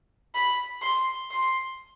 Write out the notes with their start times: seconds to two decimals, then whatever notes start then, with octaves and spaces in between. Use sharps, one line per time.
0.35 B5
0.82 C6
1.31 C6